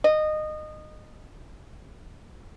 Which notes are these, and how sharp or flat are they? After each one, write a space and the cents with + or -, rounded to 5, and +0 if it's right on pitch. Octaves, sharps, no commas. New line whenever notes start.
D#5 -20